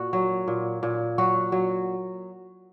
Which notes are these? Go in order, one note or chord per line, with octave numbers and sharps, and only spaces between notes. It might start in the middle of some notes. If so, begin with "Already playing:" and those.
Already playing: A#2 F#4
F#3
A#2
A#2
F#3 F#4
F#3